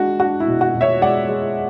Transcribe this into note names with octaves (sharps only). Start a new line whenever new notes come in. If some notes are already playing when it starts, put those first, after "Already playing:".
Already playing: G#3 D4 F#4
D4 F#4
E4
B2
F#4
B2
C#5 E5
G#3 D5 F#5
G#3